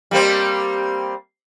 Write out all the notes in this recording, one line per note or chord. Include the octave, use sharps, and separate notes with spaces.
G3 A#3 C4